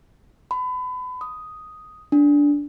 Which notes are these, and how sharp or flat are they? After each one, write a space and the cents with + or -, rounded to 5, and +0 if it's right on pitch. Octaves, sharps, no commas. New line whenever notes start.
B5 +30
D#6 +0
D4 -15